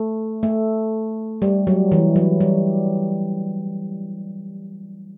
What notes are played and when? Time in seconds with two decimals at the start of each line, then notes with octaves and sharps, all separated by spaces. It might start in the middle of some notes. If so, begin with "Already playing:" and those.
Already playing: A3
0.43 A3
1.42 G3
1.67 F#3
1.92 E3
2.16 F#3
2.41 G3